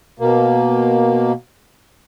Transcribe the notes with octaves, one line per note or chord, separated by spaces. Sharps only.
B2 A#3